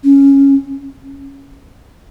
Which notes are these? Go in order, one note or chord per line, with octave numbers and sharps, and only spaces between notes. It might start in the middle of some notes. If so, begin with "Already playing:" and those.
C#4